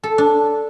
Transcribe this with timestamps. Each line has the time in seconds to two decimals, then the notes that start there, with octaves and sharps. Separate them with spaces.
0.04 A4
0.18 D4